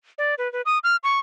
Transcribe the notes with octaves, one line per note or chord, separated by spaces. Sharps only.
D5
B4
B4
D#6
F6
C#6